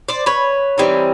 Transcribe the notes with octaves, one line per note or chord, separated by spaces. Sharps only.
C5 D5
B4 C#5
E3 G3 C4 D#4